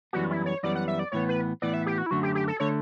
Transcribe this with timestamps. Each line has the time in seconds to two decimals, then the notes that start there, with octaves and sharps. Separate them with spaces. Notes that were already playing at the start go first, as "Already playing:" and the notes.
0.13 F#2 E3 G3 B3 F#4
0.31 E4
0.46 C#5
0.63 F#2 E3 G3 B3 D5
0.75 F#5
0.88 E5
0.99 D5
1.12 A2 E3 B3 C#5
1.29 B4
1.62 A2 E3 B3 D5
1.74 E5
1.86 G4
1.98 F#4
2.06 E4
2.11 F#2 D3 A3 F#4
2.23 G4
2.35 G4
2.48 A4
2.60 D3 A3 C#5